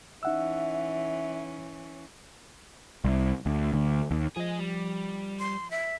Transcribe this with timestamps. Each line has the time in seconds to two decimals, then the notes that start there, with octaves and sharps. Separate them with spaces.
0.23 E3 C#4 D#4 E5 F#5 E6
3.05 C2
3.46 D2
3.74 D2
4.11 D#2
4.37 F3 G#4 D#5
4.59 G3
5.39 C6
5.71 E5